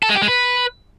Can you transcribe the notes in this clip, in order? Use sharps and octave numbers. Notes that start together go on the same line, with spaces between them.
A4
G#3
G4
G#3
B4